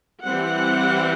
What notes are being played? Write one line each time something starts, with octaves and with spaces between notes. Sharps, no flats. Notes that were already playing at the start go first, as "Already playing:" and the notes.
E3 G3 C4 F#5